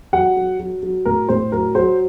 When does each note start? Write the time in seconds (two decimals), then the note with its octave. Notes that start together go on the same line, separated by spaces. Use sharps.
0.13 F#3 F#5
0.37 F#3
0.59 F#3
0.83 F#3
1.05 A2 A#4
1.29 A2 C5
1.52 F#3 A#4
1.75 F#3 C5